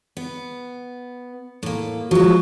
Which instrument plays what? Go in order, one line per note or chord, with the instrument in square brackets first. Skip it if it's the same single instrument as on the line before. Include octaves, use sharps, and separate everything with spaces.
[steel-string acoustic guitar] B3
A2 A#3
[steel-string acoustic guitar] F3 G#3 [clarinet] F#4